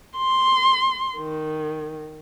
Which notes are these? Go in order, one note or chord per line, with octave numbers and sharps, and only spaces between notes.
C6
D#3